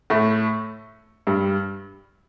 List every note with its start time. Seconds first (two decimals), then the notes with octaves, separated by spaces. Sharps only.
0.10 A2 A3
1.27 G2 G3